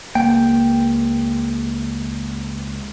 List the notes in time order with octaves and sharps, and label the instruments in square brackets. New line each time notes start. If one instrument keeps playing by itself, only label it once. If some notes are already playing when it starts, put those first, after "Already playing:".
[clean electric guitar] C#2 G5 [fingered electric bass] A#3